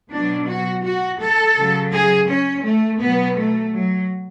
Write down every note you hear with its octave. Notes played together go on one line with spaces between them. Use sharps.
B2 F#3 D4
F#4
F#4
A4
C#3 F#3
G#4
C#4
A3
B2 F#3 B3
A3
F#3